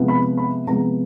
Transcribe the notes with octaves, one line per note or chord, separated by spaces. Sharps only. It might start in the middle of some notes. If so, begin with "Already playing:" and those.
Already playing: C3 F3 G#3 B3
B5
B5
C3 F3 G#3 B3 A#5